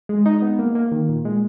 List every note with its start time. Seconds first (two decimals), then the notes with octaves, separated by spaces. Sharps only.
0.09 G#3
0.26 D#4
0.42 B3
0.59 A#3
0.75 A#3
0.92 D#3
1.09 A#2
1.25 G#3